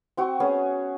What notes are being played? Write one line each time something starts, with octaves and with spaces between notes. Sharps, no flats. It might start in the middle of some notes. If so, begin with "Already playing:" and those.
C4 F#4 G5 C#6
B3 C#4 G#4